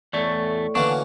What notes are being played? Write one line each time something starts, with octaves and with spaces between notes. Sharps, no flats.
E2 A2 A3 D5 C#6
D3 E3 A#3 C#4 D4 F#4 C#5 C#6